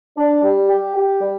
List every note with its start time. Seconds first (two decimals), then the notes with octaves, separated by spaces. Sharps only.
0.17 D4
0.43 G3
0.68 G4
0.96 G4
1.21 G3